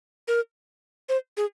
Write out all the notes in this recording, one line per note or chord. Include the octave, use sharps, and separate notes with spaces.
A#4
C5
G#4